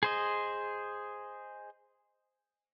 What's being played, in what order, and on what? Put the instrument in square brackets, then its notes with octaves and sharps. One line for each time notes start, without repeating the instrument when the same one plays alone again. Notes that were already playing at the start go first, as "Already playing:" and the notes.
[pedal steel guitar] G#4 C5 D#5